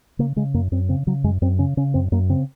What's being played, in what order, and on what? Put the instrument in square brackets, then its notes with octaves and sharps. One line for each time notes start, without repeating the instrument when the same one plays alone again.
[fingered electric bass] C#3 A#3
C#3 G#3
F#2 A#3
F#2 C4
C#3 C4
C#3 F#3
F#2 G#3
F#2 C4
C#3 C#4
C#3 C#4
F#2 C4
F#2 A#3
C#3 C4